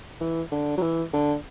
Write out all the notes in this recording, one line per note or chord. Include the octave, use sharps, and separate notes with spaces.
E3
D3
F#3
E3
D3